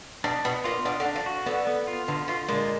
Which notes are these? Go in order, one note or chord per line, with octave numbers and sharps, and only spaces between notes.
B2 D4
B2 B3
A#2 F4
B2 D4
D3
D4
F3
F#4
D3 B3
B3
F4
B2 D3
B2 F4
A#2 G#3